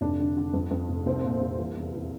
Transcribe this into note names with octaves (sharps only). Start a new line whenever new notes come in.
F1 D4
D3
D3
F2
F2
F1
C2 C4
A#2
C2
E3
E2
E3